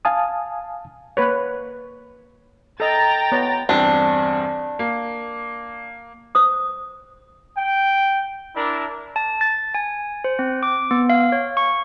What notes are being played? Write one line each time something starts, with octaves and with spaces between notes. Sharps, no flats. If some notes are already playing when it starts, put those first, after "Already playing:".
F5 G#5 A5 D#6
A#3 B4 C#5
A4 D#5 G5 A#5 A6
B3 C#5
E2 G2 C4 D4
A#3
C5 D#6
G5
D4 E4 A#4
A5
A6
G#5
C5
C4
D6
B3
F5
C#5
C#6